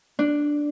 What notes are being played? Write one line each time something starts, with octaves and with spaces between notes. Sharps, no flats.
D4